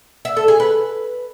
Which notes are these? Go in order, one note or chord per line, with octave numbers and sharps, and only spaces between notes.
E5
A4
G#4
B4